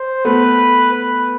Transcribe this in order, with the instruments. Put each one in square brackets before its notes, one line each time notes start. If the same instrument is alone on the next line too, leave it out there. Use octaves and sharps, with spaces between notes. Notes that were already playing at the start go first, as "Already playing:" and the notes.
Already playing: [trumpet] C5
[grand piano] A3 B3 [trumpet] B4
[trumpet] B4